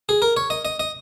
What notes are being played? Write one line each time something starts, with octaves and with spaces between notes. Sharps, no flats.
G#4
A#4
C#5
D#5
D#5
D#5